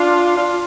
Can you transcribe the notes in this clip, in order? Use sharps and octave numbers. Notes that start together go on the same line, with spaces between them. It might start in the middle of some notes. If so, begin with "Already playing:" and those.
Already playing: D4 F4
D4 F4